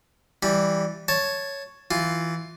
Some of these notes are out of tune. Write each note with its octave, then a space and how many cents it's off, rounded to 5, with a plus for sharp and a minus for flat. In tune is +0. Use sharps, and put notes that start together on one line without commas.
E3 +0 G3 +0 B5 -20
C#5 +0 A5 +0
E3 +0 F4 +0